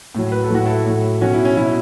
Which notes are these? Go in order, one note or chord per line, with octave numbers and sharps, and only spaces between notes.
A2 F#3
B4
A4
A2 F#3 F#4
E4 A4
A2 F#3
B2 F#3 C#4 F#4
E4
C#4
B2 F#3 E4